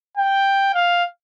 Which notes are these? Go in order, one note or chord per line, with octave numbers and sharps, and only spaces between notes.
G5
F5